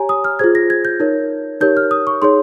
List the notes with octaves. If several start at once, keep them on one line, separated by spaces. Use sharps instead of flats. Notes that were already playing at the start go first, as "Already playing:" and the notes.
Already playing: G4 C#5 G#5 A#5
D#6
F6
F4 G#4 C5 G#6
A#6
G#6
G6
D#4 A#4 C#5
D#4 G4 A#4 C#5 G6
F6
D#6
C#6
D#4 G#4 C#5 C6